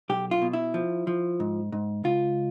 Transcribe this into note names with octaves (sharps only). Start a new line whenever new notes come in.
B1 G4
F4
B2
E4
F3
F3
G#2
G#2
C#2 F4